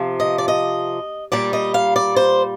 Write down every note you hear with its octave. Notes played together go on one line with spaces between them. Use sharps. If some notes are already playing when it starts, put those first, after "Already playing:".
Already playing: C3 F3
D#5
D5
D#5
A#2 G3 D5
D#5
F5
D5
C5